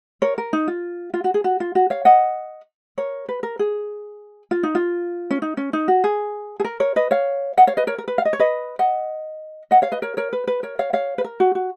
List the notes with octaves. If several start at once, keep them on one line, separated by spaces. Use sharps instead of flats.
A#4 C#5
A#4
D#4
F4
F4
F#4
G#4
F#4
F4
F#4
C#5 F5
D#5 F#5
A#4 C#5
B4
A#4
G#4
F4
D#4
F4
C#4
D#4
C#4
D#4
F#4
G#4
G#4
A#4
A#4 C#5
B4 D#5
C#5 F5
D#5 F#5
C#5 F5
B4 D#5
A#4 C#5
A#4
B4
F5
D#5
C#5
B4 D#5
D#5 F#5
D#5 F#5
C#5 F5
B4 D#5
A#4 C#5
A#4 C#5
B4
B4
A#4 C#5
C#5 F5
C#5 F5
B4
A#4
F#4
F#4